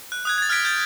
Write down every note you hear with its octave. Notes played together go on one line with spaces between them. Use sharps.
F#6
D#6 F#6 G#6
G#6 A6
F6 F#6 G#6 B6 D7
G6 A6